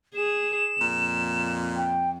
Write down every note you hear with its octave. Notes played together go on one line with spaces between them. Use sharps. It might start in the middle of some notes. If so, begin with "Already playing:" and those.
G#4 E7
F2 A#2
G5